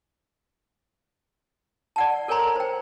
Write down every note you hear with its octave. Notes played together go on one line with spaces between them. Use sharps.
D5 F#5 A5
A4 A#4 C#5 G#5 A#5 C6
C5 G5